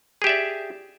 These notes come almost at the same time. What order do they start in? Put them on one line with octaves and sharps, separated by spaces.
G#4 G4 E5 D5